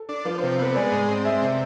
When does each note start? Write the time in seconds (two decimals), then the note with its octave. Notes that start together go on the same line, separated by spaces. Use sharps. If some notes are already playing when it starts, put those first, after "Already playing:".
Already playing: A4
0.09 D4
0.25 F3 B4
0.38 C5
0.43 C3
0.59 B3 B4
0.75 G#3 D5
0.92 G#2
1.08 C4
1.24 G#3 E5
1.42 C3